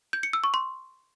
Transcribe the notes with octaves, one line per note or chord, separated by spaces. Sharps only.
G6
C#7
E6
C#6
C6